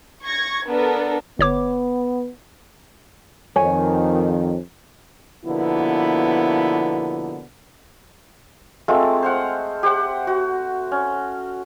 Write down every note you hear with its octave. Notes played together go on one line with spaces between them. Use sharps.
C#6 G#6 A#6
B3 D4 A4 A#4
G1 B3 C#5 D6
F2 D#3 C#5 G#5
B2 D3 F3 A#3 B3 E4
G#3 A3 C4 F4
C5 F5 F#5
G4 C5 F#5
F#4
C#4